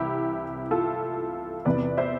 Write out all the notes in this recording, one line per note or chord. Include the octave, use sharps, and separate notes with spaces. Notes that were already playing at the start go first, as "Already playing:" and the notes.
Already playing: C2 C3 E3 E4 G4
F4 A4
E2 C3 E3 B3 B4 D5
C5 E5